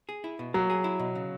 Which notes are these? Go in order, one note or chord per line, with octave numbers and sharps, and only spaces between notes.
G#4
E4
B2
F#3 A#3
G#4
E4
B2
C#3